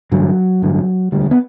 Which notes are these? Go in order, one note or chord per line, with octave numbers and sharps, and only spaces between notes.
A1 G2 D3 F#3
A1 G2 D3
E1 D2 D3 G3
B3